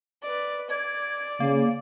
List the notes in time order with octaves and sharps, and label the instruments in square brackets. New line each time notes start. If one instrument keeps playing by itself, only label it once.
[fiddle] B4 D5
[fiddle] D5 [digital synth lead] G#6
[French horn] C#3 [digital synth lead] A#3